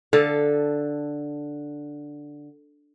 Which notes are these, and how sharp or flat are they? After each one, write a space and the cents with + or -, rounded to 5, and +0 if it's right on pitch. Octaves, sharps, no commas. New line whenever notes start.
D3 +0 A4 +0 F5 +0